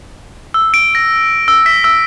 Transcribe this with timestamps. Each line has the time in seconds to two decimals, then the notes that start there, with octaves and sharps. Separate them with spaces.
0.54 E6
0.74 D7
0.95 A#6
1.48 E6
1.66 B6
1.84 E6